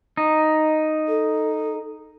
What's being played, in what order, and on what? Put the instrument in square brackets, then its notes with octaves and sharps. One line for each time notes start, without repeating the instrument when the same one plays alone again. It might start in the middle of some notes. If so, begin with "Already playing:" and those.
[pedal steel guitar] D#4
[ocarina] A4